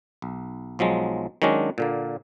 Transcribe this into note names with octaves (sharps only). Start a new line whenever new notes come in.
B1
B1 F3 F#3 G#3
D#3 F#3 G#3 C#4 D4
A#2 D3 A#3